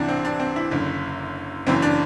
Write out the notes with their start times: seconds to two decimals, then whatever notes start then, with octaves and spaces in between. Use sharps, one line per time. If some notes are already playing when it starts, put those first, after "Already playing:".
Already playing: C2 C3 E3 D4
0.08 C4
0.25 D4
0.40 C4
0.56 E4
0.71 F#1 F#2 D3
1.67 F#1 F#2 E3 C4
1.82 D4